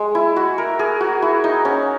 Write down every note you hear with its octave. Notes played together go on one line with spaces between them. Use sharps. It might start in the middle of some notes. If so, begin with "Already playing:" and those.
Already playing: G#3
E4
F#4
A#4
G#4
F#4
E4
D#4
C#4